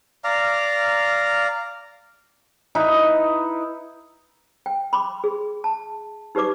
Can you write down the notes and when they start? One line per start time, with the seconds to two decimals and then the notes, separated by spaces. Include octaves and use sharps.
0.24 D5 F5 A#5
2.75 D#4 E4 B4
4.66 G5
4.93 B5 C6 D6
5.24 G#4
5.64 A5
6.35 D#4 G4 B4 D5 D6